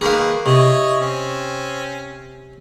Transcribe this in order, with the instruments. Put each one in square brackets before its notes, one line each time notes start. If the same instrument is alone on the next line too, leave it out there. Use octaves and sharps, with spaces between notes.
[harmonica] D#3 A#3 B4 [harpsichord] G#4 F5
[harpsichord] C3 [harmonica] E4 C#5 D#5
[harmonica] C4 C#4